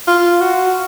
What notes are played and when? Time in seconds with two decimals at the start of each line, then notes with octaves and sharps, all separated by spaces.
0.07 F4
0.41 F#4